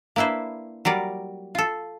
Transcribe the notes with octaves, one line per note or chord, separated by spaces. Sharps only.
A#3 D4 E4 B4 C5
F#3 G3 A#4 D5
F4 A4